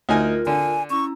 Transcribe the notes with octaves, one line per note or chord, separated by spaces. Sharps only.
D2 D#4 F4 A#4 G#5
D3 G#5
C#4 E4 A#5 C#6